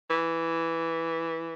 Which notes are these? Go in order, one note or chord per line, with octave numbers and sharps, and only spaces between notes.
E3